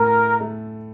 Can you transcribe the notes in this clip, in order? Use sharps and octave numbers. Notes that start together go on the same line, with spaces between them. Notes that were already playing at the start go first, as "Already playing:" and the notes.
Already playing: A2 A3 A#4
A3